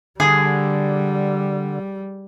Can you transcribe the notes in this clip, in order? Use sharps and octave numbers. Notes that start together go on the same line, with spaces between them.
D3 G3 G#4